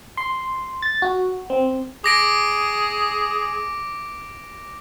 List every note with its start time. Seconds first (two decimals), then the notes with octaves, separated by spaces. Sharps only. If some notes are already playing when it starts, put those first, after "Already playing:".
0.17 C6
0.82 A6
1.02 F#4
1.50 C4
2.04 G#4 D6 A#6 D7